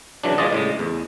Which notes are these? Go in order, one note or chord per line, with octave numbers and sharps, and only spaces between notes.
C#3 E3 F#3 D4
E3 G#3 F4 D5 D#5
A2 C#3 G#3
E2